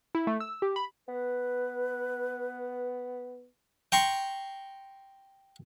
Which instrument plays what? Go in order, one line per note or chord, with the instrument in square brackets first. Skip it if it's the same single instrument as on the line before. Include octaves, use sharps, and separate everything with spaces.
[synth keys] E4
A3
E6
G4
B5
[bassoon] B3 [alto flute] B4
[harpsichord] G5 A#5 C6 C#6